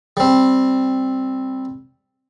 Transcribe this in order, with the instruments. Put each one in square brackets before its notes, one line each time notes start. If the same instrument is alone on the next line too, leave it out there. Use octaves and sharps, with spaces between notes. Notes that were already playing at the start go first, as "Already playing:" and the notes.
[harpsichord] G3 C4